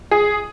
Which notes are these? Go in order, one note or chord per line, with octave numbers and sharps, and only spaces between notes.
G#4